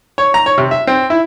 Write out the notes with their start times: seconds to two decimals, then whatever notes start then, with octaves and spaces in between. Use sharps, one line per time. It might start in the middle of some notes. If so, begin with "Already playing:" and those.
0.18 C#5
0.34 A#5
0.46 C#5
0.58 C3
0.71 E5
0.87 C4
1.10 E4